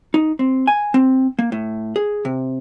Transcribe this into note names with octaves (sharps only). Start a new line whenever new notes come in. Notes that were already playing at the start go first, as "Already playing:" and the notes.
D#4
C4
G#5
C4
A#3
A2
G#4
C3